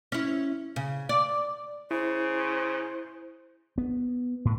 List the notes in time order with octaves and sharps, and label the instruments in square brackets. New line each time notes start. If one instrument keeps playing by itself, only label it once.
[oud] C#4 E4
C#3
D5
[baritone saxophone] C#3 [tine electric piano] E4 [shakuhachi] C5
[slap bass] B3
A2